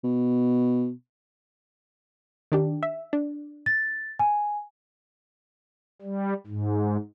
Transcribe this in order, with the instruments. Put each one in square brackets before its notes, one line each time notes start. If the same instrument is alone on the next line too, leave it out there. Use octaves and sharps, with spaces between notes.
[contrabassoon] B2
[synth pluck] D#3 D4 G4
E5
D4
[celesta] A6
G#5
[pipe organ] G3
G#2